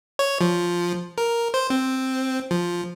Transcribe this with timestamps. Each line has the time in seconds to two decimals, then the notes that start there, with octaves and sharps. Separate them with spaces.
0.19 C#5
0.41 F3
1.18 A#4
1.54 C5
1.70 C4
2.51 F3